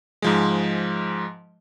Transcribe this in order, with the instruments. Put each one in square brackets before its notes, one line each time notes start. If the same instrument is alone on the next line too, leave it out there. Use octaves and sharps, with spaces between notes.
[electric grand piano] G#2 F3 G#3